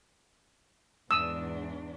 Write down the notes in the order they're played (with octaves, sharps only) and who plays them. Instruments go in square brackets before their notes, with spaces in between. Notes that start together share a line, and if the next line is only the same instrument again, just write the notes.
[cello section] E2 G#2 D4 [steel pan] D#6 E6